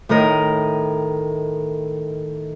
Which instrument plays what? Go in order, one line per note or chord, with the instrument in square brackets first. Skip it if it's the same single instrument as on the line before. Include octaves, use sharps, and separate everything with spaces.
[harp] A2 D#3 A#4 D#5